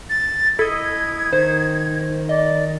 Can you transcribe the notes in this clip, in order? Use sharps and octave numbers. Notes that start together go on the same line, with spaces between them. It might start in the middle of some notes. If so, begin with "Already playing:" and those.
A6
E4 A4 D#5 G#6
D#3 C5
D5 D#5